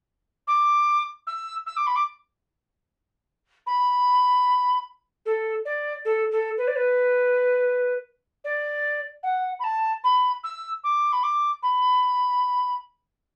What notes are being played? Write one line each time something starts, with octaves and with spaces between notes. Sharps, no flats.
D6
E6
E6
D6
B5
D6
B5
A4
D5
A4
A4
B4
D5
B4
D5
F#5
B5
A5
B5
E6
D6
B5
D6
B5